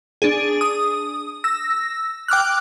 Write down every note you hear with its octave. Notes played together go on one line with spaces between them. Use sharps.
D4 G#4
D#6
E6 A#6
G5 D6 F6 F#6